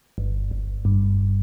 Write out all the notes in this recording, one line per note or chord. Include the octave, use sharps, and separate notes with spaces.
G1
G1
G2